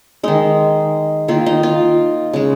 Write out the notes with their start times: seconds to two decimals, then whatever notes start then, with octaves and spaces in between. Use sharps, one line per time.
0.23 D#3 G#3 D#4
1.28 D#3 A#3 F4
1.46 D#4
1.63 F4
2.33 C#3 G#3